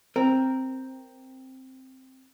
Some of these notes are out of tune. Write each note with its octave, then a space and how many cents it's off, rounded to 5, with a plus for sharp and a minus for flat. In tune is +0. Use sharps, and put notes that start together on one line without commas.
C4 +0 A#4 +0